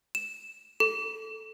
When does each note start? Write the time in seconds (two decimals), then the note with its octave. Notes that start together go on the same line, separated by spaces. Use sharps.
0.15 E7
0.80 A4